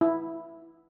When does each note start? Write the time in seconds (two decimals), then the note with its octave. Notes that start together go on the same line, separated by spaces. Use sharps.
0.01 E4